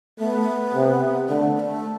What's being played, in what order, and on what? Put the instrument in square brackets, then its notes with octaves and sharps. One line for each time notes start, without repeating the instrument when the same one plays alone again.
[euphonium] A3 [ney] B3
[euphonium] C3
[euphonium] D3 [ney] A3
[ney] B3
A3